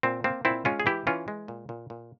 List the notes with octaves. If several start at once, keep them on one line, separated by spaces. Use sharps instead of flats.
A#2 C4
A#3 C4
A#2 C4 E4
G#3 C#4 F4
G#4
E3 E4 G4
E3 C#4 F4
G#3
A#2
A#2
A#2